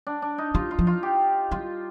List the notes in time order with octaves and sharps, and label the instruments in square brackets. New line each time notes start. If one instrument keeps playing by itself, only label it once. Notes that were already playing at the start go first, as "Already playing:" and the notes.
[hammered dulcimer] D4
D4
D#4
[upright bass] G3 [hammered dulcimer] F4
[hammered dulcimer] F4
[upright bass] F3
[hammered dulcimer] F4
G4
[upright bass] G3 [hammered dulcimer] F4